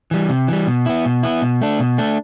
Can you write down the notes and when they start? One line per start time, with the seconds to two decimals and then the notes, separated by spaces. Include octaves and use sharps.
0.11 E3 G3
0.29 C3
0.48 E3 G3
0.67 B2
0.86 B3 E4
1.05 B2
1.23 B3 E4
1.42 B2
1.61 A3 D4
1.79 B2
1.98 A3 D4